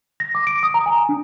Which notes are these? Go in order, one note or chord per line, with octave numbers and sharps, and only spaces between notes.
A#6
D6
D7
D#6
A#5
G#5
D4